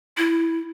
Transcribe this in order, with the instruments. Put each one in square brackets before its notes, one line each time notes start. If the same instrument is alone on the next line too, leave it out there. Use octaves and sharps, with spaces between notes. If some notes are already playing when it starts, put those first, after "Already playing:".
[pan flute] E4